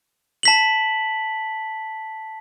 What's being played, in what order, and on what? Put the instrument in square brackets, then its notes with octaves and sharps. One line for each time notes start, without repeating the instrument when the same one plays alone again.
[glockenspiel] A5 B6 F#7